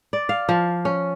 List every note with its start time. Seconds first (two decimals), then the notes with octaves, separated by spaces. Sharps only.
0.13 D5
0.29 F5
0.49 F3
0.85 C#4